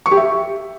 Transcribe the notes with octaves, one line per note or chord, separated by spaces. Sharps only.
C#6
G4
E5